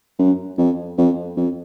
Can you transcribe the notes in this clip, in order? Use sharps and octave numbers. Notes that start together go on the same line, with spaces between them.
F#2
F2
F2
F2